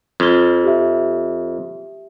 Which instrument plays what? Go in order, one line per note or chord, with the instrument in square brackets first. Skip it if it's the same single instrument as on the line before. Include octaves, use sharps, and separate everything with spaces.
[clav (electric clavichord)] F2 [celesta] F6 G#6 G7
[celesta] G4 E5